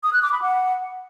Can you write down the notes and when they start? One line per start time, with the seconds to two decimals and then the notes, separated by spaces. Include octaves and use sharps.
0.03 D#6
0.13 F#6
0.23 D6
0.32 B5
0.42 F#5